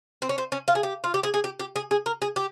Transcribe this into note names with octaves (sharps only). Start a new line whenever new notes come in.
C4
C#4
C4
C#4
F4
G#4
G4
F4
G4
G#4
G#4
G4
G4
G#4
G#4
A#4
G#4
G4